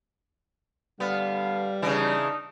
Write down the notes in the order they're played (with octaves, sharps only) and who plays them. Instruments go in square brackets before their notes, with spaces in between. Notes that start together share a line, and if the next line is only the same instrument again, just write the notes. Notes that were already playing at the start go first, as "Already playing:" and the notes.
[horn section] D3 F5 [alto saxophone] G3 [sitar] B3
[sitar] C#3 E3 [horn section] D4 D#4